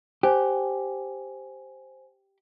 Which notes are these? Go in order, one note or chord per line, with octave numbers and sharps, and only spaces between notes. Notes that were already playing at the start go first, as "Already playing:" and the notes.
G4 C5 G#5